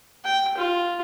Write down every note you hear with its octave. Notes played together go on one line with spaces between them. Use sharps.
G5
F4